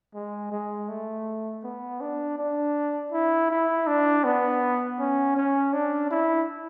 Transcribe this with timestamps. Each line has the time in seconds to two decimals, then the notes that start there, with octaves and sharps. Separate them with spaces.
0.15 G#3
0.52 G#3
0.88 A3
1.64 B3
2.01 D4
2.38 D4
3.12 E4
3.50 E4
3.87 D4
4.24 B3
4.99 C#4
5.36 C#4
5.73 D4
6.10 E4